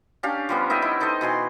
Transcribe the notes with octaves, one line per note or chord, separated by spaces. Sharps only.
C#4 D4 G4 F5
F3 G3 B3
D#4 D#5 E5 G5
B3 E4
D#4 A4 C5 D#5
B2 E3 G#5 C6